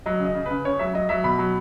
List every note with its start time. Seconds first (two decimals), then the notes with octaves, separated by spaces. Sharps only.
0.06 F#3 D#5
0.20 C#3
0.25 D#5
0.35 C#3
0.46 B4
0.51 C#3
0.65 C#3 C#5
0.79 F#3 E5
0.94 F#3 D#5
1.09 F#3 E5
1.24 B2 B5
1.39 F#3